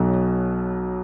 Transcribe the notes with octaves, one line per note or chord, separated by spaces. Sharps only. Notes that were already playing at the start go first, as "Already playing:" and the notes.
Already playing: B1 B2 F#3